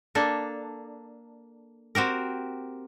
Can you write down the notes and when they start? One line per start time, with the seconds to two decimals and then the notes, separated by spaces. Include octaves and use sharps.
0.15 A#3 D4 A4
1.95 C4 F#4 G4 A#4